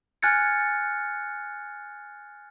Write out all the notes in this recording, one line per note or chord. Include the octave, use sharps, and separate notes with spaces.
G#5 F6 F#6 G#6 A6 C#7